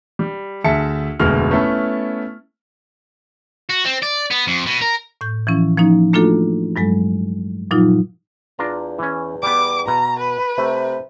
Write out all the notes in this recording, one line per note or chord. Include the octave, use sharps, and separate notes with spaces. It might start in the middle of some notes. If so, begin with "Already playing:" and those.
G3
D2 G#4 E5 A5 C#7
F1 D2 B2 G#3 F6
A3 B3 C#4 E4 A4
F#4
C4
D5
B3
F2
B2
A#4
A2 G6
E3 F3 C#4 E4
F3 A#3 C#4 D#4
A3 A#3 D4 F4 F#4 A4
G2 F#3 G#3 A4
A#2 F3 F#3 D#4 F4
E2 D4 F4 A#5
E3 C#4
G3 B3 D6
B2 A#5
B4
C3 A3